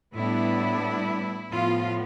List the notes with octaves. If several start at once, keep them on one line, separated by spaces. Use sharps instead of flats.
A2 G3 B3 D4 E4
A2 F3 B3 F4